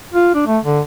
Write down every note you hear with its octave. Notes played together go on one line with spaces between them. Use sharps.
F4
D4
A3
D3